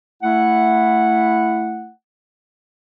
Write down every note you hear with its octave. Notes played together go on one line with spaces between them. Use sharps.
A3 E4 F#5